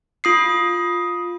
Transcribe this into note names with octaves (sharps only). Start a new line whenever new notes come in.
F4 D#6 C7